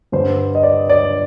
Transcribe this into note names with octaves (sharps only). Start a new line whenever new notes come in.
G2 D3 C5
D#5
D5
D5